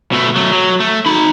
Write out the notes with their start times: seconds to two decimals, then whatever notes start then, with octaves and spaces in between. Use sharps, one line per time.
0.12 B2 A3
0.36 F#3 A3
0.52 F#3
0.80 A3
1.06 D#4 B5